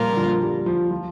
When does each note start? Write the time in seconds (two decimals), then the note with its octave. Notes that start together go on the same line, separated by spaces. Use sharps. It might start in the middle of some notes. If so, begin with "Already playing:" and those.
Already playing: A#2 F3 G3 A#3 F4 A#4
0.12 D3
0.17 F3
0.42 G3
0.66 F3
0.91 F3